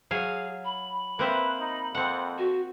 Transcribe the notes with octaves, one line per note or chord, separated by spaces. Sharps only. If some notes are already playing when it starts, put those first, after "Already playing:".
F#3 G#4 F5 G#5
B5
A#3 C4 B4 E5
D#4
F2 C4 F#5
F#4